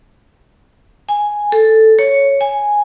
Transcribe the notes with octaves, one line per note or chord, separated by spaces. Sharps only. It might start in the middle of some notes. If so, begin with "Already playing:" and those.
G#5
A4
C#5
G#5